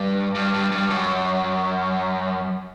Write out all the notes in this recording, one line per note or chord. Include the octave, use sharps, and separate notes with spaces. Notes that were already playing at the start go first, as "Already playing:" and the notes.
Already playing: G2
G2
G2
G2
F#2